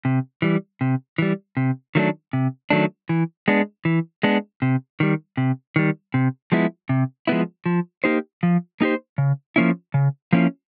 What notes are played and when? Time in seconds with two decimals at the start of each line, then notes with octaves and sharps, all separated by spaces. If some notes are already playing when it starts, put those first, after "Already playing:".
0.05 C3
0.42 E3 G3
0.81 C3
1.18 E3 G3
1.57 C3
1.95 D#3 F#3 A3 D4
2.33 C3
2.70 D#3 F#3 A3 D4
3.09 E3
3.48 G#3 B3 D4
3.85 E3
4.23 G#3 B3 D4
4.62 C3
5.00 D#3 G3
5.37 C3
5.76 D#3 G3
6.14 C3
6.52 F3 G#3 B3 E4
6.89 C3
7.27 F3 G#3 B3 E4
7.66 F3
8.04 A#3 D#4 G4 C5
8.43 F3
8.81 A#3 D#4 G4 C5
9.18 C#3
9.56 F3 A#3 C#4 E4
9.94 C#3
10.33 F3 A#3 C#4 E4